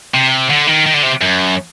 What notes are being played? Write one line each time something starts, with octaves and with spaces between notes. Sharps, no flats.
C3
D3
D#3
D#3
D3
C3
F#2